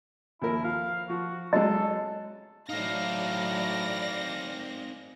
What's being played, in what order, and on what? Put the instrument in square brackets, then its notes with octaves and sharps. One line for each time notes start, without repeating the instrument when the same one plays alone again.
[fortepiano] D#2 F3 A#4 [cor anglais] E4
[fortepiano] F3 [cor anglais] F5
[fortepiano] F3 [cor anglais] F#4
[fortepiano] F#3 G#3 [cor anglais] A4 [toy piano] D#5
[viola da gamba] A2 F#3 [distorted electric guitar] C4 D#4 [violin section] D5 A#6 [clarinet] F5